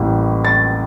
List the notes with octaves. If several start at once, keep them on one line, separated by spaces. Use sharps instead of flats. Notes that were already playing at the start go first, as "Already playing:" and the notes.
Already playing: A1 A2 G3 A#3
A6